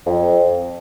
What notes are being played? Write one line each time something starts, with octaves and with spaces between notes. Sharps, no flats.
F2